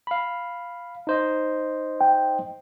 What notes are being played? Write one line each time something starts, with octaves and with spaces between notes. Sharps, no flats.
F5 B5
D#4 C5 D#5
G5